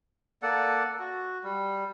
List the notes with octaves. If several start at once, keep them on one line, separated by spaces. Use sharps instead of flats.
A#3 A4 D5 F#5
F#4
G3